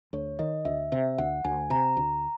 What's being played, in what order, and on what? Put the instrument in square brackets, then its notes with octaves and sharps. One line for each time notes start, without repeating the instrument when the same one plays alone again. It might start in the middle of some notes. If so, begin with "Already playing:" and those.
[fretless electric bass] D2 [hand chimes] C#5
[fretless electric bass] D#3 [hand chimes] D#5
[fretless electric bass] D2 [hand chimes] E5
[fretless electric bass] C3 [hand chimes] E5
[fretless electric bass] D2 [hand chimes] F#5
[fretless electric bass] D2 [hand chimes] G#5
[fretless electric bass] C3 [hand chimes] A#5
[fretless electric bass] D2